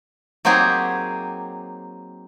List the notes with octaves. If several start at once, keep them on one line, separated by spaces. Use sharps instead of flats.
F#3 A#3 C4 D#4 G4 G#4